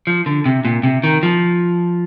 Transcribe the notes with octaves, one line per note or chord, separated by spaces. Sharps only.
F3
D3
C3
A#2
C3
D#3
F3